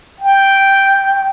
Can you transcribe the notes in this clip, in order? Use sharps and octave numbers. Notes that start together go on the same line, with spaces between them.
G5